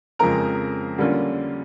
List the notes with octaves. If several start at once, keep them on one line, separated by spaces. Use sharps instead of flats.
F2 C#3 F3 G#3 C4 A#4 A#5
D3 G3 A#3 C#4 F4